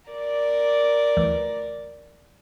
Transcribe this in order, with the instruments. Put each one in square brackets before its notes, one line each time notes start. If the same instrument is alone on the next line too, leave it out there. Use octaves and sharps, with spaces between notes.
[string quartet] A#4 D5
[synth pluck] D2 E3